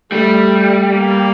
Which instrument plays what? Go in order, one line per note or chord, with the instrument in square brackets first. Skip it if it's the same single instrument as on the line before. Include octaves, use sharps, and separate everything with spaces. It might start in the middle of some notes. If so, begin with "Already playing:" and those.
[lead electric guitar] G3 [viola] A3
[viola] A#3